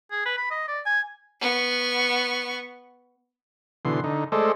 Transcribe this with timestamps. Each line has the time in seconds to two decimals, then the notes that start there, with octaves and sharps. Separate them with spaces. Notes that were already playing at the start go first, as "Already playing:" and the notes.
0.11 G#4
0.25 B4
0.37 B5
0.51 D#5
0.68 D5
0.86 G#5
1.41 B3 C#6
3.85 B2 D3 E3 C6
4.04 D3 D#4
4.32 G#3 A3 A4 C5 D5 D#5